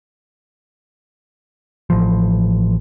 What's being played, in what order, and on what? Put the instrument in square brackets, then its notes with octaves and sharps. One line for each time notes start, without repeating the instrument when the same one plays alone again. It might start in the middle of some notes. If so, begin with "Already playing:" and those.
[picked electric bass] A1 F3